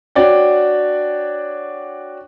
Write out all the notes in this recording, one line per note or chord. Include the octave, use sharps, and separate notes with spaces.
D4 F#4 C#5 D5 F#5 G5